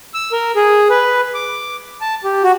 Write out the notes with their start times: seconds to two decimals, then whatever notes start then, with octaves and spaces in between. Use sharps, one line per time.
0.14 E6
0.32 A#4
0.56 G#4
0.90 B4
1.34 D6
2.01 A5
2.24 G4
2.44 F#4